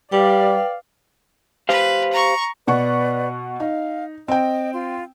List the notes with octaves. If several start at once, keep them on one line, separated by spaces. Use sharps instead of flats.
G3 B4 D5 F5 G5
G4 B4 C5 F5
A#5 C#6
B2 B4 D5 F#5 C#6
D#4 F5
C4 D#5 G5
F4 C6